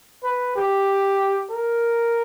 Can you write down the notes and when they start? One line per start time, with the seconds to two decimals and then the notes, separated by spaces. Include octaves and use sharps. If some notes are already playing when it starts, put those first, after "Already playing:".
0.23 B4
0.56 G4
1.51 A#4